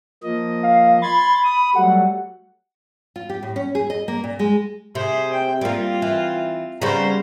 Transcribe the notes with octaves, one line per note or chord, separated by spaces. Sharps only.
F3 A#3 D#5
F5
B5 C6 G#6 A6
D#6
F#3 G3 A3 F#5
F4
G4
A2
C#4
G#4
D#5
A#3
A#2
G#3
C3 G#4 C5
G5
G3 A#3 C4 F4
E3
C#3 G3 B3 C5 A#5